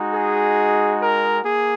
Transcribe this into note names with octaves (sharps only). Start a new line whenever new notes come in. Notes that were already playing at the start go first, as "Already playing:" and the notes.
Already playing: G#3 D#4 F#4
G#4
A#4
A#3 G#4